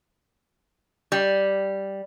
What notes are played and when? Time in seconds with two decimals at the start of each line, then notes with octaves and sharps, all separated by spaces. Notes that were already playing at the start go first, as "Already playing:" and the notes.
1.12 G3